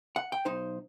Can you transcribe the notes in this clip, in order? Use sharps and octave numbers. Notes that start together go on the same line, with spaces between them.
F#5
G5
B1 D#4 C5